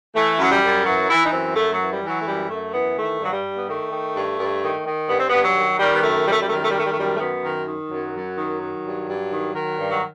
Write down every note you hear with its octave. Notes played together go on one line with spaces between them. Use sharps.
E3 A3
F#2 F#3
G3
F#2
E3 F#3
E3 E4
D#4
F#2 C4
F#2 A3
F#3
E3
G3
E3
F#3
A3
F#2 G3
F#2 A3
E3 B3
D#3 A3
G2 F#3
G3
G2
B3
D#3 A3
D#3
G2
G2
D#3
D#3
G2 B3
C4
G2 B3
F#3
D#3
D#3 G3
B3
F#2 A3
F#2 G3
A3
G3
D#3 A3
G3
A3
D#3 G3
A3
G3
A3
F#2 G3
A3
F#2 B3
D#3
D#3
F#2 F#3
F#2
D#3
D#3
G2
G2
D#3
D#3
G2
F#3